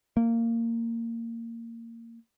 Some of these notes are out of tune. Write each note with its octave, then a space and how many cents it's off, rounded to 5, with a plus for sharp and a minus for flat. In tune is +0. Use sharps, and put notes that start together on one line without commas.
A#3 -20